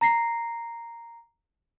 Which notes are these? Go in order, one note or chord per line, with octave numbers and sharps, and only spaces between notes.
A#5 A#6 C7